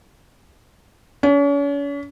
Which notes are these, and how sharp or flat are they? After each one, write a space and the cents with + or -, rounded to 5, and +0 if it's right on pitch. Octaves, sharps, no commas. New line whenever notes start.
C#4 +40